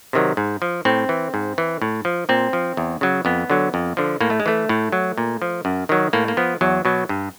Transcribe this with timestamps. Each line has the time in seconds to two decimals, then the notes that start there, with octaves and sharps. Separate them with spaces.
0.13 C3 D#3 F#3
0.37 G#2
0.62 F3
0.85 A2 C4
1.09 E3
1.34 G#2
1.58 E3
1.82 A2
2.05 F3
2.29 A#2 C4
2.53 F3
2.77 E2
3.01 C#3 F#3
3.25 F2 B3
3.50 D3 F#3
3.74 F2
3.97 D3 F3
4.21 A2 A#3
4.30 A3
4.40 G#3
4.46 E3 A3
4.69 A2
4.92 F#3
5.18 A#2
5.42 F3
5.65 F#2
5.89 D#3 F#3
6.13 A2 A#3
6.28 A#3
6.37 F3 B3
6.61 E2 F#3
6.85 B2 F#3
7.09 G2